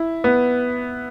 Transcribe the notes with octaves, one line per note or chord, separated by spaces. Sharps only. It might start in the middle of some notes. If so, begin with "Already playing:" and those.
Already playing: E4
B3